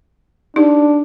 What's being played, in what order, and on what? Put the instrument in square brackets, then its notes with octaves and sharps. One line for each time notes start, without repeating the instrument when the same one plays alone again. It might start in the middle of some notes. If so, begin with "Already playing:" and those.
[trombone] D4 [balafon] D#4 G4